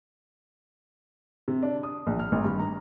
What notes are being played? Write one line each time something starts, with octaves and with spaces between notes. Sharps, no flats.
C3
D4
D#6
A#1
F6
G#1
G2
A#5